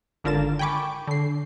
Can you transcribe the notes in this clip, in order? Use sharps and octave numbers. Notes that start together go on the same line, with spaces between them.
G#1 D3 F4 A#4 A6 E7
G5 G#5 B5 C#6 D6
D3 C7